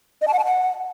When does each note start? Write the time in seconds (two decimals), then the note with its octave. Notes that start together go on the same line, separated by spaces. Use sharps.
0.22 D#5
0.27 A5
0.33 F#5
0.39 A5
0.45 F#5